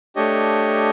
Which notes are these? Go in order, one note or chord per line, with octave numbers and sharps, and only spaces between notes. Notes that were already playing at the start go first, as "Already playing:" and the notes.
A3 D4 G4 C#5 D#5